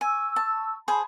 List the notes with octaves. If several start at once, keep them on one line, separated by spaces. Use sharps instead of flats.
G#5 C#6 E6
A5
G#4 C5 A5 B5